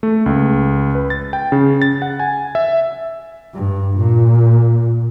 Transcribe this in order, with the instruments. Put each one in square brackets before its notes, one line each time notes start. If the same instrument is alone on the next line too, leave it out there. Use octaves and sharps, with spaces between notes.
[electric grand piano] A3
C#2
B4
A6
G5
C#3
A6
F#5
G#5
E5
[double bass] G2
A#2